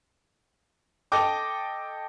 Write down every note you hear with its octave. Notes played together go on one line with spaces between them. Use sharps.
A4 D#5 G5 D6